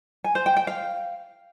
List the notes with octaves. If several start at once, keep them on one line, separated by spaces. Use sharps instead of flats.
G#5
C5
G5
G5
F5